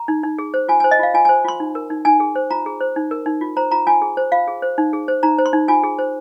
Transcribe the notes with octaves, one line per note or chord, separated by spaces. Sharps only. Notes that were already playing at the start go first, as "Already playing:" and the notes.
Already playing: A#5
D#4
D#4
G#4
C5
F4 G#5
G#5
C5
D#5
F4 F5
F4 G#5
G#5
C5
F4 C6
D#4
A#4
D#4
D#4 G#5
G#4
C5
F4 A#5
G#4
C5
D#4
A#4
D#4
F4
C5 A#5
F4 A#5
F4 G#5
G#4
C5
F4 F5
G#4
C5
D#4
G#4
C5
D#4 A#5
C5
C6
D#4
F4 G#5
G#4
C5